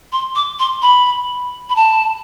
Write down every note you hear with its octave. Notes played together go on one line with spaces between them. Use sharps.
C6
D6
C6
B5
B5
A5